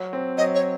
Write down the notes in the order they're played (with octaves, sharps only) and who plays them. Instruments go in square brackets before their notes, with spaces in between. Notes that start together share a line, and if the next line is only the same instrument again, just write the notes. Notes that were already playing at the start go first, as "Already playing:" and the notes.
Already playing: [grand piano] F#3
C4
[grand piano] F#3 [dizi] D#5
[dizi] C#5